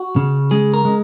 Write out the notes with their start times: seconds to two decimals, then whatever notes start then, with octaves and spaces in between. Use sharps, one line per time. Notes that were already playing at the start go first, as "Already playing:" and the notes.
Already playing: F#4
0.16 C#3
0.51 G#3 G#4
0.74 A#4
0.85 G#3